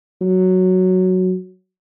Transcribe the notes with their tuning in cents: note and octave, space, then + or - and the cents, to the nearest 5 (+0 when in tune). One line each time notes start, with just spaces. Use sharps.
F#3 +0